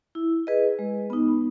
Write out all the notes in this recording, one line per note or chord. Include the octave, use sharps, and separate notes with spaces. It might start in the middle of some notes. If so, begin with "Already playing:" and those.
E4
G#4 B4 D#5
G#3
B3 D#4